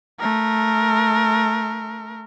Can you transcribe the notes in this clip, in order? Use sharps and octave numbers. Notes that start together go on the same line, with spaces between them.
A3 A#4